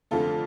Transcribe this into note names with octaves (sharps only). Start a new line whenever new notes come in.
F1 F2 D3 A3 F4 A4